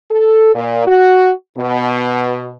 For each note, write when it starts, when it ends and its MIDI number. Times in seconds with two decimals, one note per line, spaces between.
0.11 0.54 69
0.55 0.85 46
0.86 1.31 66
1.58 2.56 47